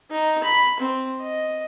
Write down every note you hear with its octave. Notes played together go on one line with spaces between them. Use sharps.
D#4
B5
C4
D#5